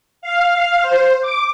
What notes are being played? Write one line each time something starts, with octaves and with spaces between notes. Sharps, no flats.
F5
C5
D6